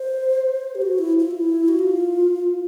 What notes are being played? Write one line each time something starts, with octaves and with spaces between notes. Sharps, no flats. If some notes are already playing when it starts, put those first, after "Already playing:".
Already playing: C5
G4
F#4
E4
F4
E4
F#4
F4